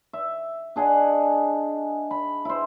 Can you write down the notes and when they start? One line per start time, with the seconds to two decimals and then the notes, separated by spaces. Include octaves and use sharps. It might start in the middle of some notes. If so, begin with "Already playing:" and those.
0.13 E5
0.76 D4 G#4 D#5 F#5
2.11 B5
2.45 E4 C5